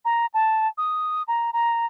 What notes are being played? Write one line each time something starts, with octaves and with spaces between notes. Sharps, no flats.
A#5
A5
D#6
A#5
A#5